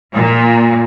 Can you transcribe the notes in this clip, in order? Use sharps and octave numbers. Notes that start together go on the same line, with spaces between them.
A#2